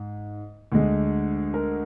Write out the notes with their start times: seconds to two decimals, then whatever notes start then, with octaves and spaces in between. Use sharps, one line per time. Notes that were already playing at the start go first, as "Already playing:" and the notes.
Already playing: G#2
0.72 D2 D3 G#3
1.54 A#4